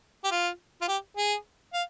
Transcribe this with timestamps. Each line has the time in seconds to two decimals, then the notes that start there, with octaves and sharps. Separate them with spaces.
0.24 G4
0.31 F4
0.81 F4
0.88 G4
1.17 G#4
1.73 F5